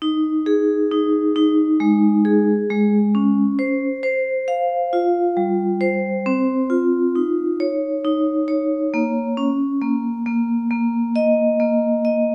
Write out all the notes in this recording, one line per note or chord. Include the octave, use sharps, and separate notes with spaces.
D#4
G#4
D#4
D#4
G#3
G#4
G#3
C#4
C5
C5
F5
F4
G3
C5
C4
F4
D#4
C#5
D#4
C#5
A#3
C#4
A#3
A#3
A#3
D#5
A#3
D#5